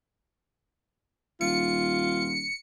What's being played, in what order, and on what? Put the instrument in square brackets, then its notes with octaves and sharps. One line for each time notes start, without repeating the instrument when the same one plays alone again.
[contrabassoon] D#1 [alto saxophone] F4 [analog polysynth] C#7